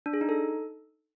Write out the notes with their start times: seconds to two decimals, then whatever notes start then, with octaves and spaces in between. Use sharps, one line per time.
0.06 D4
0.13 G#4
0.21 D#4
0.29 A4